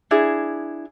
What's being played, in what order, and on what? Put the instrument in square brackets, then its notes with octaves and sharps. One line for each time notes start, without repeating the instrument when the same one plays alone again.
[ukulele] D4 E4 G#4